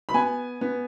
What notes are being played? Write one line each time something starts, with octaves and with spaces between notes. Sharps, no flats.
B5
B3 G#5
B3